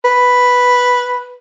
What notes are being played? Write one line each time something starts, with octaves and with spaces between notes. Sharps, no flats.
B4